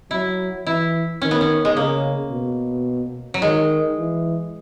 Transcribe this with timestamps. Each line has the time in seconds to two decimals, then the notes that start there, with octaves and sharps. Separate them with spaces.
0.11 F#3 E4
0.66 E3 E4
1.21 D#3 C#4
1.31 B3
1.41 C#4
1.65 G#3
1.76 C#3 A#3
2.31 B2
3.34 F#3
3.42 D#3 G#3
3.98 E3